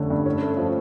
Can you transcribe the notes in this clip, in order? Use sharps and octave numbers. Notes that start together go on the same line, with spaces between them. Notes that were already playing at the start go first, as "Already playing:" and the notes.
Already playing: F1 D3 A3 C#4
G2
C#4
A3
F3